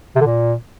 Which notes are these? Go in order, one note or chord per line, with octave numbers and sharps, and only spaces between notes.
C3
D3
A#2